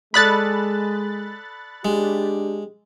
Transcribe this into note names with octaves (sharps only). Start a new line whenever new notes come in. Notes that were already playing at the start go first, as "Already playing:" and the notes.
G#3 A4 D5 B5 D#6 F#6 A6
G#3 D4 G4